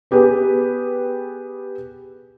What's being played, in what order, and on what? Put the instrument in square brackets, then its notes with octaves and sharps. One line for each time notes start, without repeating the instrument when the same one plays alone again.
[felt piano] B3 G4 G#4 B4